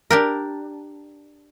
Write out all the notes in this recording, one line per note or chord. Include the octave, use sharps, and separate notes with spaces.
D4 G4 A#4